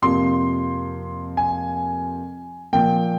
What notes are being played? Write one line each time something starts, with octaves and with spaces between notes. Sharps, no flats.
F2 C3 F3 A#3 C6
G#5
A#2 F3 A#3 G5